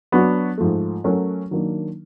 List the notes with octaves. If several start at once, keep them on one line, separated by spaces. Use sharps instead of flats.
F#3 B3 D4 F#4
G#2 F3 A3
F#3 A3 C#4 F#4 A#4
D#3 F#3 A#3 D4